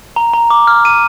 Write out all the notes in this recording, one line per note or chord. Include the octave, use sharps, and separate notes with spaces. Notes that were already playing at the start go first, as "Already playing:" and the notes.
A#5
A#5
D6
F6
D#7